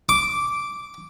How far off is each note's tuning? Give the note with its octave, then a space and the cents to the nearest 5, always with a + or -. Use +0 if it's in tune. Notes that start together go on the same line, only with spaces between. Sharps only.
D6 -10